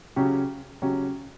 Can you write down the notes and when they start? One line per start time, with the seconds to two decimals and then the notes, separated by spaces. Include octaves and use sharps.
0.16 C#3 F#3 C#4 G4
0.82 C#3 F#3 C#4 G4